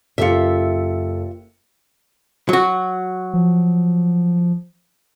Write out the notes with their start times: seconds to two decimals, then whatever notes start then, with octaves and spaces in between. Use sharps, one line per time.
0.18 F#1 F4 G4 A4 E5 C#7
2.49 F#3 F#4
3.33 F3